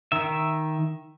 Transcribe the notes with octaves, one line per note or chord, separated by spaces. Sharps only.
D#3 E5